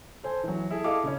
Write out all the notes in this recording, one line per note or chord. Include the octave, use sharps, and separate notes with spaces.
A4 C5 G#5
E3 F#3
E4 G#4 A4
E4 G#4 A4 D#5 F5 D6
C#3 C#4